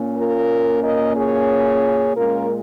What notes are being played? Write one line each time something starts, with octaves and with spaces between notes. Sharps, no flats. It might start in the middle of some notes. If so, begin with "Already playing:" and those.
Already playing: A#2 A#3 C#4
F4 A#4
A#4 D#5
G#4 C#5
A#2 G#3 C#4 F4 A#4